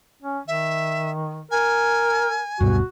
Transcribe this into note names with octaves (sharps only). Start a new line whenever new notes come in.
C#4
D#3 E5
A#4 G#5
D1 G2 B2 F#4